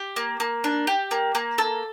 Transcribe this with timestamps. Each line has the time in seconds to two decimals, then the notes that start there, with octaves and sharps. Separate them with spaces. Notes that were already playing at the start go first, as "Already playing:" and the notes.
Already playing: G4
0.16 A#3
0.40 A#3
0.64 D4
0.87 G4
1.11 A#3
1.35 A#3
1.58 A4